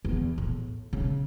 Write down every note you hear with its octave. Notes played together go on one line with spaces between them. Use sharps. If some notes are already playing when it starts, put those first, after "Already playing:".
E2
A2
C#3